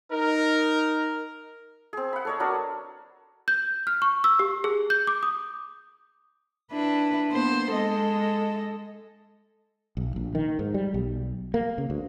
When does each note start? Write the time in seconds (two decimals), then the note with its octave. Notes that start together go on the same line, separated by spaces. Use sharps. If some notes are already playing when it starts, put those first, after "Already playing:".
0.10 D#4 A#4
1.93 C4 G#4
2.13 F#5 B5
2.25 A4 C#5 D#5
2.40 F#3 D4 A#4
3.48 G6
3.87 F6
4.02 C#6
4.24 E6
4.39 G4
4.64 G#4
4.90 G6
5.07 D6
5.23 D#6
6.72 D4 E4 B4
7.29 A#3 B3 C5
7.71 G#3 A4 D#5
9.97 B1
10.16 A#1
10.35 D#3
10.59 G#2
10.74 G3
10.94 B1
11.54 A#3
11.78 C#3
11.90 D2